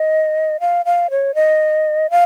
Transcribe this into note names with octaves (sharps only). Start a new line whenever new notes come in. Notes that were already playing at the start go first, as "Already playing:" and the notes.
Already playing: D#5
F5
F5
C#5
D#5
F5